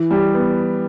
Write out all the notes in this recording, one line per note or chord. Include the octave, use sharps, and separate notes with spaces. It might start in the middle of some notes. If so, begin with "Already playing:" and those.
Already playing: E3
G3
B3